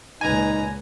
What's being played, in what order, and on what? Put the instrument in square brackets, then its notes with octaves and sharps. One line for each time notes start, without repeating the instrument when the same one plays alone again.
[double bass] C#2 A#2 [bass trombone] D#4 [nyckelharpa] B4 A#5 [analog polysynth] G#5